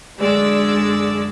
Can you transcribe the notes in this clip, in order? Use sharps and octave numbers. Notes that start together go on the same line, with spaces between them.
F#2 D3 G#3 D5 E6